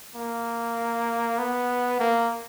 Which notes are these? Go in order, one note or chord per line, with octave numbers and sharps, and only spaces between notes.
A#3
B3
A#3